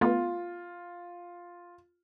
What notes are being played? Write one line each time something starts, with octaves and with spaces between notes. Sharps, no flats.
A3 B3 F4